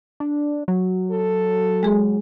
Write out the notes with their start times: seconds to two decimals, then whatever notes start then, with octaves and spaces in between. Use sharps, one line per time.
0.20 D4
0.68 F#3
1.11 A4
1.83 G#3 G#4